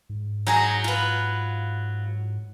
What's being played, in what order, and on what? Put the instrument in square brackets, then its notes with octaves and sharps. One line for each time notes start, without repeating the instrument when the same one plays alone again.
[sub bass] G#2
[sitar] F#3 [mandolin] D#4 G#4 A#5
[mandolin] F4 B4